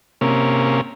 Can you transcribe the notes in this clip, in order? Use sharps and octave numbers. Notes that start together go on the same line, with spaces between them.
C3 A#3 C#4